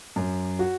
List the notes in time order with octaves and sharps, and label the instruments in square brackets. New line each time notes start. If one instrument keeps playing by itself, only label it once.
[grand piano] F#2
F#4